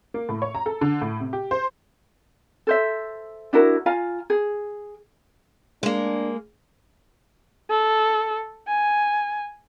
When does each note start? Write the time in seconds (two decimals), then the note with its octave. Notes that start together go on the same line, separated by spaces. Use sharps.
0.14 A#3
0.29 A2
0.42 C#5
0.55 A#5
0.66 A4
0.81 D3
1.02 A2
1.20 C3
1.33 G4
1.51 C5
2.67 A4 C5 E5
3.53 D4 E4 F#4 A#4
3.86 F4 F5 G#5 A#5
4.30 G#4
5.83 G#3 A#3 D4
7.71 A4
8.68 G#5